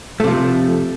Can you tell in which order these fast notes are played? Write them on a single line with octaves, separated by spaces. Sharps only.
A3 C3 F3